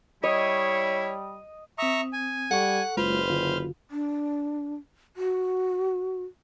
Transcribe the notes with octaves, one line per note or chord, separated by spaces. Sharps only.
G3 E4 C#5 D#5
C4 E5 A#5 C#6 D#6
G#5
G3 A4 F#5 C#6
F#1 G#3 F4 B4 C5 F6
D3 F4 F#4
D4
F#4